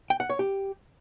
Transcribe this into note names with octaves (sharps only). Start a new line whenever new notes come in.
G5
F#5
C#5
G4